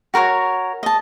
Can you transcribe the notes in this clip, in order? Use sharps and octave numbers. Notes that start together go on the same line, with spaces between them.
F#4 A#4 B4 C#5
D#5 A5